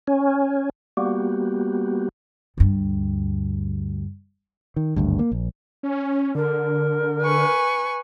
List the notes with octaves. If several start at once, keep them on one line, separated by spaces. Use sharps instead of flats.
C#4
G3 A#3 B3 F#4 G4
D2 G2
D#3
G#1 D2 G2
A#3
A#1
C#4
D3 A#4
B4 G#5 C#6